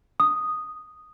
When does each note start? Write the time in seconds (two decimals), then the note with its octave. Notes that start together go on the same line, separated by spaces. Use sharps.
0.20 D#6